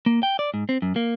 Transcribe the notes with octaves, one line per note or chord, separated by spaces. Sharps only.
A#3
G5
D5
G#2
C4
F#2
A#3